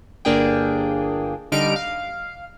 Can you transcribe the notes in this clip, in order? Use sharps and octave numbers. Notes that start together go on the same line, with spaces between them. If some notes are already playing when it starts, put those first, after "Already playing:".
G1 A#3 D4 G#4 G5
D3 G3 D#4 F6 D7
F5